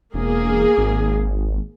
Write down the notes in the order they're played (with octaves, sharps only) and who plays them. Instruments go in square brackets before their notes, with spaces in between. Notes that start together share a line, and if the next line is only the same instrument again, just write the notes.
[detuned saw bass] E1 [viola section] A#3 G#4
[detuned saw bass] G#1